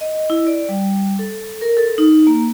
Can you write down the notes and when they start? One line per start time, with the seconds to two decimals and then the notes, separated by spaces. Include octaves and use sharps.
0.01 D#5
0.30 E4
0.47 D5
0.69 G3
1.19 A4
1.61 A#4
1.77 A4
1.98 D#4
2.27 A#3